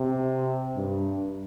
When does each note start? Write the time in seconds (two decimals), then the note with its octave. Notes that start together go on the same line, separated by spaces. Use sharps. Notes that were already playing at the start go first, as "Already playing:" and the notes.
Already playing: C3
0.76 G2